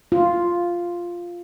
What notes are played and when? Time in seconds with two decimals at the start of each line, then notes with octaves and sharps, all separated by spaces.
0.12 F4